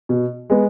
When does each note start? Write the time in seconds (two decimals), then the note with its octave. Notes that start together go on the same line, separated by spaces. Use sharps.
0.09 B2
0.50 G#3 B3